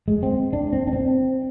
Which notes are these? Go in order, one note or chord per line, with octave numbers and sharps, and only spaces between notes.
G#3
C4
D4
C4
D4
C4